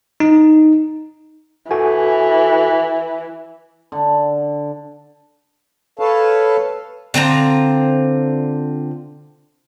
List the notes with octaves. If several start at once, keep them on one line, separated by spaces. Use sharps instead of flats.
D#4
E3 F#4 A4 G#5
D3
A4 B4 C#5 F5 A5
D3 C4 F4 A#5